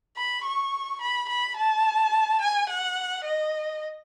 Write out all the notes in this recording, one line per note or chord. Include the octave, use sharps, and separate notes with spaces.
B5
C#6
B5
B5
A5
G#5
F#5
D#5